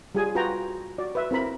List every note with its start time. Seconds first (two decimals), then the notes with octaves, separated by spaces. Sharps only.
0.15 G3 F4 G#4 G#5
0.35 F4 F#4 B4 G5 A#5
0.98 F#4 D5
1.15 B4 E5
1.31 C4 E4 A#4 B5